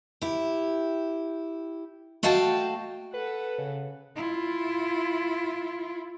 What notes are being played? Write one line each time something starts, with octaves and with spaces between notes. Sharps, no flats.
E4 G4
A3 F#4 D#5 F5 G5 A5
A4 B4 F#5
C#3
E4 F4